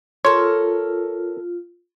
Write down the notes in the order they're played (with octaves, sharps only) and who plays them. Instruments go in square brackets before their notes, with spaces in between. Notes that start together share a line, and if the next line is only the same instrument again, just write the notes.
[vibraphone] F4 [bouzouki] A4 A#4 [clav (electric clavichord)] C#5 [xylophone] C6